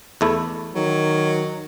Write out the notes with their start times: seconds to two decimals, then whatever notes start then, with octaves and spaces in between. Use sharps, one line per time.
0.21 E2 A3 E4
0.75 D#3 F#3